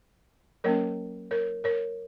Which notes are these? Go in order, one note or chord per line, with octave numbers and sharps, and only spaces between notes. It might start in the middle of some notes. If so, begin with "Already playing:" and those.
F#3 A#3 C#4 A#4 C#5
A#4 C#5
A#4 C#5